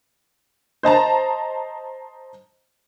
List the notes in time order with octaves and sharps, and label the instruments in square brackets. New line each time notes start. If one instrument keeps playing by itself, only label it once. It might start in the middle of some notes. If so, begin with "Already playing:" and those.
[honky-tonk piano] C5 D#5 A5 A#5